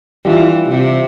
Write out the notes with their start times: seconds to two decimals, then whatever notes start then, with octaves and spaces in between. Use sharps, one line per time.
0.25 E3 G3 D4 F4
0.70 C3